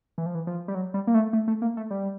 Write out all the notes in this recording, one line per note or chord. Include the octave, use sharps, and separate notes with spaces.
E3
F3
E3
F3
G3
F#3
G3
A#3
A3
A3
A3
A#3
A3
G3